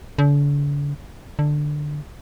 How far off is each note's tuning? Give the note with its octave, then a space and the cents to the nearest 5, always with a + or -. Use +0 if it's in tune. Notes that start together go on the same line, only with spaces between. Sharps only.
D3 -40
D3 +10